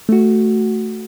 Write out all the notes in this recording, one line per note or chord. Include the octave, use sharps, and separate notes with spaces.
A3 F#4